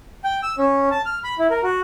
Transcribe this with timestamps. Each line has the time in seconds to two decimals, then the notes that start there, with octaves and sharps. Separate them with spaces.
0.24 G5
0.43 E6
0.58 C#4
0.91 A5
1.06 F6
1.24 B5
1.39 E4
1.51 A#4
1.63 F#4